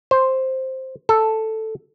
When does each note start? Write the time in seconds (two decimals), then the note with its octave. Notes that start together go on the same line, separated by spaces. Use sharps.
0.11 C5
1.09 A4